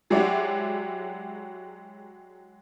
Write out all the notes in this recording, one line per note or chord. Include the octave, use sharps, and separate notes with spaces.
F#3 G#3 E4 F#4 G4 D5